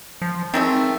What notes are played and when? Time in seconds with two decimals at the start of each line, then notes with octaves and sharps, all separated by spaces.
0.22 F3
0.54 D#3 G#3 A3 C4